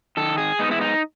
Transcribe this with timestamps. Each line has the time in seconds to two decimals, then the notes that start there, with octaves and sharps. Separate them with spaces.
0.17 D#3 A4
0.38 G#4
0.59 G#3 B3 D#4
0.71 E4
0.81 D#4